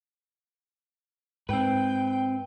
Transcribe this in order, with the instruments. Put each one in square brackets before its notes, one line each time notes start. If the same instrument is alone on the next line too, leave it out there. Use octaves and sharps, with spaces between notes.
[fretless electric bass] G#2 [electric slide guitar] C4 B4 [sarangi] G5